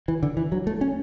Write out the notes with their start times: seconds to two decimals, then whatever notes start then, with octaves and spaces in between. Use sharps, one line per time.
0.08 E3
0.23 D3
0.37 E3
0.52 F#3
0.67 A3
0.81 C#4